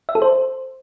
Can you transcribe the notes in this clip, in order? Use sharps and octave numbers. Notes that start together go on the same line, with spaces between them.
E5
A4
C5